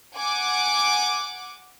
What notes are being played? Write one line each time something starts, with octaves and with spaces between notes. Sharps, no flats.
F#5 G#5 D6